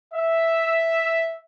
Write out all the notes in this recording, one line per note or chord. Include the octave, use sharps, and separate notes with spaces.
E5